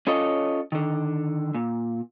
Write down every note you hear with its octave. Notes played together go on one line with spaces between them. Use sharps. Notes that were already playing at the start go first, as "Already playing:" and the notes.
C#4 F4 A4 C#5 D#5
D3 D#3
A#2